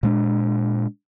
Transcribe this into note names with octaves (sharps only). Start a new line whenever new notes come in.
A#2 G#3 D4